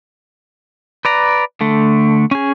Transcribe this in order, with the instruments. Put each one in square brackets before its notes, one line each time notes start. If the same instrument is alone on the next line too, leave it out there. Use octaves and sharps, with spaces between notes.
[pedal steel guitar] B4 D5 A#5
D3 A3
C#4 G#4